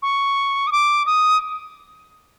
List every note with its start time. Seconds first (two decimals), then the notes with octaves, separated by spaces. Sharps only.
0.02 C#6
0.67 D#6
0.72 D6
1.06 D#6